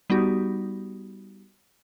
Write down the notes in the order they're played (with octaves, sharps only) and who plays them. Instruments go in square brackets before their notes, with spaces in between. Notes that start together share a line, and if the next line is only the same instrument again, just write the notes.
[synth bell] G3 B3 D#4 F#4 G4